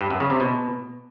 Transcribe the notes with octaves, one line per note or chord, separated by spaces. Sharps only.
G2
F#2
C#3
C3
B2